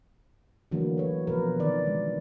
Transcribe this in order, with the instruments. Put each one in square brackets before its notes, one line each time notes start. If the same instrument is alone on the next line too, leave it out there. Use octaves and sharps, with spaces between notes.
[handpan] D3 E3 F#3 A3 A#3
B4 C#5
B2 F3 B3 A#4 B4
D#3 D5
D3 G#3